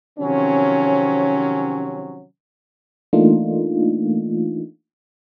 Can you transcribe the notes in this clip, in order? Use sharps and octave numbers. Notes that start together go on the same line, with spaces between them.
C3 D#3 F3 F#3 C4 C#4
E3 A3 A#3 D4 D#4 F4